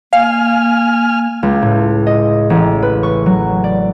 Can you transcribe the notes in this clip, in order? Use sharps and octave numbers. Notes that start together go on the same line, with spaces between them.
A#3 F5 G#5 F6
C#2
A2
D#5
A1
B4
C#6
F#3
D5